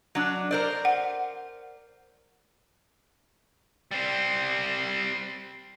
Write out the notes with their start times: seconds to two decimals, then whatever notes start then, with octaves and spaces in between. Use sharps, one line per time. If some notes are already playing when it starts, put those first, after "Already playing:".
0.15 F#3 D4
0.51 A#4 C5 D5
0.85 F#5
3.91 G3 C4